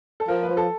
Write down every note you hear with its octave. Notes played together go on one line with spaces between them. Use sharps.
A4
F3 A#4
B4
F3
A4